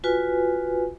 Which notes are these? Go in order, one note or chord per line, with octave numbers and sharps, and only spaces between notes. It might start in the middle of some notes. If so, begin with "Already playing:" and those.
F4 F#4 B4 G#5